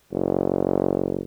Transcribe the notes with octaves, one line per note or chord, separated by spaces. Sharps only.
F#1